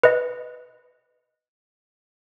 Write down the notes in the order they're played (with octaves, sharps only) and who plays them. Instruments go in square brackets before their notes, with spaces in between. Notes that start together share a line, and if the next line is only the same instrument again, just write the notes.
[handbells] B4 D#5